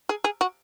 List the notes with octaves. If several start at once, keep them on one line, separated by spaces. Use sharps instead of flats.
G#4
G#4
F#4